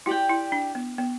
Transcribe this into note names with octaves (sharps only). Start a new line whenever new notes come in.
E4 G4 D5 G5
E4
D4
B3
B3